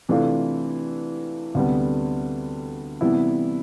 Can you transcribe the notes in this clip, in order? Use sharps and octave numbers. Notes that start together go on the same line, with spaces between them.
C3 E3 A3 D4 F4
D2 C3 G3 B3
C3 E3 G3 B3 E4